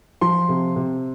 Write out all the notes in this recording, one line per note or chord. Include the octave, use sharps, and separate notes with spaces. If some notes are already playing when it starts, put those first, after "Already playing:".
F3 C6
C3
C3